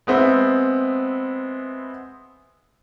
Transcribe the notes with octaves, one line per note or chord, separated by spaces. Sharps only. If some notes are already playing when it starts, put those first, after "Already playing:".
G#3 B3 C4 E5